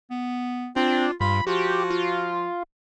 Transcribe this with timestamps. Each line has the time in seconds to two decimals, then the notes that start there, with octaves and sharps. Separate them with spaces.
0.10 B3
0.76 C4 D4 F4
1.21 G2 F4 B5
1.47 F3 F#4 G4
1.91 F4